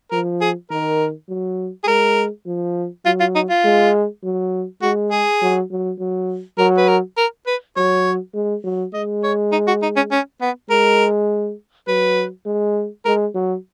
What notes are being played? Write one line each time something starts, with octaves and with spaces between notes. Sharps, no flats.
F3 A#4
G#4
D#3 A#4
F#3
G#4
G#3 A#4
F3
F#3 F4
F4
D#4
F4
G#3
F#3
G#3 F#4
G#4
F#3
F#3
F#3
F#3 A#4
B4
A#4
A#4
B4
F#3 C#5
G#3
F#3
G#3 D#5
C#5
D#4
F#4
D#4
C#4
C#4
B3
G#3 A#4
F#3 B4
G#3
G#3 A#4
F#3